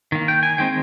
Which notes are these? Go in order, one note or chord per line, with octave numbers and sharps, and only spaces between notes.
D#3 A#3
G5
G#5
D#3 G#3 C4 G5